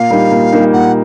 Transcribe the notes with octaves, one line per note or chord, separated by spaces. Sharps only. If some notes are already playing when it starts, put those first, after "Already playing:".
Already playing: A#2 F5
G3 A#3 D#4
A#2
G3 A#3 D#4
A#2 F#5